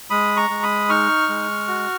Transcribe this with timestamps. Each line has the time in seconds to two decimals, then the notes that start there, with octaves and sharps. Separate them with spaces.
0.10 G#3 B5 D#6
0.36 A#5 C#6
0.50 G#3
0.63 B5 D#6
0.89 D#4 C#6 F6
1.29 G#3
1.68 F#4